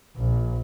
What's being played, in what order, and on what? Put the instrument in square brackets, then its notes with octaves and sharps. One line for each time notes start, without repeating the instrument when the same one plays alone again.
[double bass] A#1